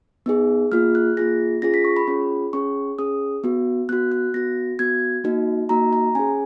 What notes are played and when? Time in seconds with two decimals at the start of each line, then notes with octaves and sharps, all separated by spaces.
0.26 B3 D#4 G#4
0.72 A#3 F4 G#4 F6
0.95 F#6
1.17 A#3 F4 G#4 A#6
1.62 C#4 F4 G#4 A#6
1.74 B6
1.84 C#6
1.96 B5
2.07 C#4 F4 G#4 B5
2.53 C#4 G#4 C#6
2.99 C#4 G#4 D#6
3.44 B3 F#4
3.89 B3 F#6
3.93 F#4
4.12 F#6
4.34 B3 F#4 A#6
4.79 B3 F#4 G#6
5.24 A#3 D#4 F#4
5.69 A#3 D#4 F#4 A#5
5.93 A#5
6.15 C#4 G#4 G#5